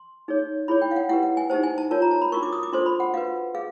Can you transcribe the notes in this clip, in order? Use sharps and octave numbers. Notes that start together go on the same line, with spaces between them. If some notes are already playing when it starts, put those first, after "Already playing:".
Already playing: C6
D#4 G#4 C#5
E4 G#4 C#5 B5
G5
F5
F#5
E4 G4 B4 F#5
F#5
G#5
D#4 G4 C5 A5
G#5
A5
F4 A#4 C#5 A5
A#5
A5
B5
D4 F#4 A#4 C#6
D6
D#6
D6
D4 F4 A4 C5 C6
B5
F#5
F#4 B4 F5
G#4 F5